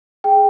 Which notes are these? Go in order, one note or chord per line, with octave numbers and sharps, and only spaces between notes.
G#4 G5